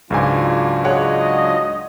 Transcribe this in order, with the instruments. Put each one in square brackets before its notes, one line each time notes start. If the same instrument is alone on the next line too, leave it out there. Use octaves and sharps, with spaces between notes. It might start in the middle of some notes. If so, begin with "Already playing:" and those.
[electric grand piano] C#2 G#2 G#5 [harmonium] F#3 D4 F4
[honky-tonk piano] G#4 C#5 F#5 [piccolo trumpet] D#5